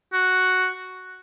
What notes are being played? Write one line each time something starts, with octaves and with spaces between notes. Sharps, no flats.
F#4